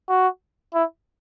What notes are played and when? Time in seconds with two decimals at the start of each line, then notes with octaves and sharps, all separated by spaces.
0.09 F#4
0.74 E4